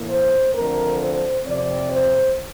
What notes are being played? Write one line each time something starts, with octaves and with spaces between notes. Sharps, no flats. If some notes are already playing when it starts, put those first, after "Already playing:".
Already playing: A2 E3 A#3
C5
D3 F3 A3 C4 A#4
C5
F2 C3 F3 C4 D5
C5